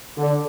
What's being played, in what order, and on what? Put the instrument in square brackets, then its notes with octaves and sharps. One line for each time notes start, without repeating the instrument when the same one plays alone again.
[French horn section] D3